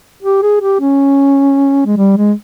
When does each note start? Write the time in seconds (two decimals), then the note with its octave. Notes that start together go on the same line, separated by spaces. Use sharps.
0.23 G4
0.42 G#4
0.61 G4
0.80 C#4
1.86 G#3
1.97 G3
2.17 G#3